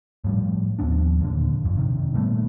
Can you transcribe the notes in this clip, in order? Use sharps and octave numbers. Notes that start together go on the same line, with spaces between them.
A2 F3 G3
D#2 F3 B3 D4
D#2 A#2 D3
G1 F2
C3 D#3
A#2 G3 A3 B3